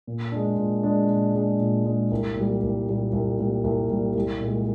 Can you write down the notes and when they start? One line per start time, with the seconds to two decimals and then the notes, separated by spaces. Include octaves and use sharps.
0.07 A#2
0.32 G#3 D4
0.58 A#2
0.83 G#3 D4
1.09 A#2
1.34 G#3 D4
1.60 A#2
1.85 G#3 D4
2.11 C2
2.36 A#2 G3
2.63 C2
2.88 A#2 G3
3.13 C2
3.39 A#2 G3
3.64 C2
3.90 A#2 G3
4.15 C2
4.41 A#2 G#3